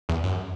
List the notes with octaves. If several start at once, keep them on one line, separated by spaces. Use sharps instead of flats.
E2
F#2